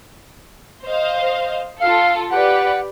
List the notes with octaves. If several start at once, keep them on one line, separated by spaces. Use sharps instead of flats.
C5 D#5 F5
F4 A4 F5
G4 B4 D5 F#5